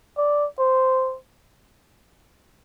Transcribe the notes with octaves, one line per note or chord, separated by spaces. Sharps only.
D5
C5